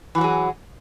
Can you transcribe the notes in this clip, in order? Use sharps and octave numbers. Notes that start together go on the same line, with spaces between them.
E3 F#3 F#4 G#4